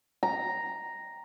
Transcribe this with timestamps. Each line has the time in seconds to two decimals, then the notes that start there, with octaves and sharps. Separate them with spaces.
0.23 A#5